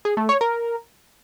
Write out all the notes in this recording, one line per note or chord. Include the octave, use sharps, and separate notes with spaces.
G#4
A3
C#5
A#4